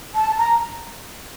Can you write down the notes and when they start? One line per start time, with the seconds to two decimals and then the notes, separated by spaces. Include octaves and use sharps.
0.15 A5
0.38 A#5